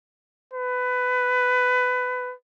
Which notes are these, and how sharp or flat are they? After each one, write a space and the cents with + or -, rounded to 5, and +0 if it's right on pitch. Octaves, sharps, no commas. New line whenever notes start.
B4 +20